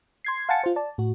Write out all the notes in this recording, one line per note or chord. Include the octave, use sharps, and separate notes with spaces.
C6 G#6 C7
F5 F#5 G#5 A5 A6 C#7
F4 C5
D5 A5
A2 F#4